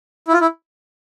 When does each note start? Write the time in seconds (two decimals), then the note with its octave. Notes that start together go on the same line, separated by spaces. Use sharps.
0.28 E4
0.33 F4
0.41 E4